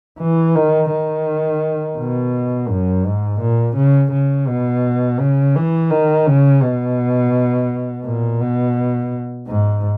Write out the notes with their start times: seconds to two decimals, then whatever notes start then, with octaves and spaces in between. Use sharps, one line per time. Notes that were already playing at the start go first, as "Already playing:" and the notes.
0.19 E3
0.55 D#3
0.91 D#3
1.98 B2
2.69 F#2
3.06 G#2
3.41 A#2
3.77 C#3
4.12 C#3
4.48 B2
5.20 C#3
5.55 E3
5.91 D#3
6.27 C#3
6.62 B2
8.05 A#2
8.41 B2
9.48 G#2